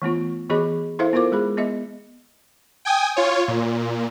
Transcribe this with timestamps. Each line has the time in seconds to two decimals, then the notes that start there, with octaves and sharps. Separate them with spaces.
0.02 E3 A3 B3 F4
0.49 E3 B3 F#4 G#4 D#5 B5
0.99 E4 A4 C5 E5 F5
1.13 B3 F4 A#4 C5 D6
1.32 G#3 G#4 B5
1.57 B3 D#5 E5
2.85 G5 G#5 D#6
3.16 F4 C#5
3.48 A#2